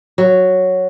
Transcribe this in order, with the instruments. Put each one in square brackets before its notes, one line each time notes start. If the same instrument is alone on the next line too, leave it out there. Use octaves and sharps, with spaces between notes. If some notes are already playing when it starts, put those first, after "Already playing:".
[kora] F#3